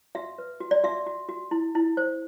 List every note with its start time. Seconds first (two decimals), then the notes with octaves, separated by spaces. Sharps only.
0.15 F#4 E5
0.38 B4
0.60 F#4
0.71 D5
0.84 F#4 E5
1.06 F#4
1.29 F#4
1.51 E4
1.75 E4
1.97 C5